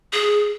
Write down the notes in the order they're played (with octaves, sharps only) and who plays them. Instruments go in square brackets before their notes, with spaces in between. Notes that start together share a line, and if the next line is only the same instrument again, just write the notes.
[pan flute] G#4